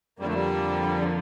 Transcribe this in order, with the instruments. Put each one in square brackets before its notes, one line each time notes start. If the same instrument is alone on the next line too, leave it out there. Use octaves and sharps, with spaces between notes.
[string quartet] F2 D3 F3 A#3 [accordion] G3
[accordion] A3
G3